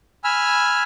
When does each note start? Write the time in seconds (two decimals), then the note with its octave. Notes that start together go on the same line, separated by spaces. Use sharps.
0.24 G#5 B5 E6 F6